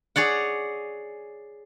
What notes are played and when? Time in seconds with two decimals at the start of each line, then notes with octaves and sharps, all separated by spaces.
0.16 G#4 C#5 D5 F#5